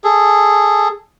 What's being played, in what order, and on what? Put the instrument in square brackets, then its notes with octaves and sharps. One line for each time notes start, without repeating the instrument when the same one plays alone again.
[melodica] G#4 A4